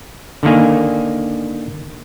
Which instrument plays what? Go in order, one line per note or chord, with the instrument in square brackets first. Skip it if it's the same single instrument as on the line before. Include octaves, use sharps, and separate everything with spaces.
[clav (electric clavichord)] D3 D#3 A#3 G#5